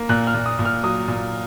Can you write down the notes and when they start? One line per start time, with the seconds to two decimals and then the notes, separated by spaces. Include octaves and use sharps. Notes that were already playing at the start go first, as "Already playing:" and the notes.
Already playing: A#3
0.09 A#2 F#6
0.27 F6
0.34 A#2
0.46 D#6
0.59 A#2
0.65 F6
0.83 F#3 D#6
1.08 A#2